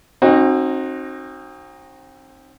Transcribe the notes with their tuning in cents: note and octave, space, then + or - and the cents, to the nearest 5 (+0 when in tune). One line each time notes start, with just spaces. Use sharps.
C4 +35 D#4 -5 F#4 +0